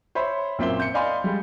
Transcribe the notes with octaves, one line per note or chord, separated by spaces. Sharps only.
C5 C#5 E5 B5 C6
F#2 A#2 C4 E5 C6 G7
G6 C#7
D5 D#5 F5 G#5 B5 C6
G3 G#3